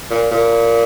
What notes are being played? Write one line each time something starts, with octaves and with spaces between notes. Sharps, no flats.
A#2
A#2